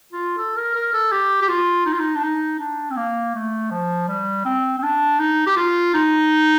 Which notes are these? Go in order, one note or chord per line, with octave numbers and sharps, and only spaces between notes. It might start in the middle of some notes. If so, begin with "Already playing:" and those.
F4
A4
A#4
A#4
A4
G4
G4
F4
D#4
F4
D#4
D4
D#4
D4
C4
A#3
A3
F3
G3
C4
C4
D4
D#4
G4
F4
D#4